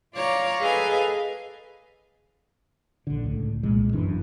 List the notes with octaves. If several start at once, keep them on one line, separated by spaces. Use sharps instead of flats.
F4 C#5 D5 F5 A#5
G#4 A4 B4 D#5 F5 G#5
A#1 D3
C#2 A2
C2 A#2 G#3
G1 F#2 E3 D4